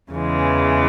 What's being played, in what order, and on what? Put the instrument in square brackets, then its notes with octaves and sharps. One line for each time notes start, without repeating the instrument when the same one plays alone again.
[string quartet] E2 C#3 E3 G#3